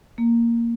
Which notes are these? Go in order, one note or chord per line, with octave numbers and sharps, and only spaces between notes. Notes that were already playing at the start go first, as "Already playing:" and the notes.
A#3